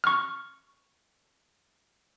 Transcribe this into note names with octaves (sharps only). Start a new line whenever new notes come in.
C#6 F6